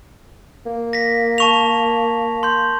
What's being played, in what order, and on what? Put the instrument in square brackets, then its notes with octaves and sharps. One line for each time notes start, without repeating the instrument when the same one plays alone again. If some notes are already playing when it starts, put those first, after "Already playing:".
[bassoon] A#3
[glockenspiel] A#6 B6
A5 C#6 F7
C6 G6